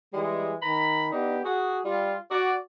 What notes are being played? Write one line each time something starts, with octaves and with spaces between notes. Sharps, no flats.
E3 G3 G#3
D#3 A#5 B5
B3 D4 D#4 G4
F#4 G#4
G3 F4
F#4 D5